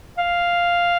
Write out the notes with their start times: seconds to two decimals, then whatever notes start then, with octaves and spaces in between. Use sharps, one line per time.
0.18 F5